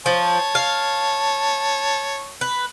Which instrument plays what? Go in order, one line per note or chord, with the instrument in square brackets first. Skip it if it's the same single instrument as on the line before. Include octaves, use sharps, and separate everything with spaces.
[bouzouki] F3 [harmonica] C#5 A5
[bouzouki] F5
B4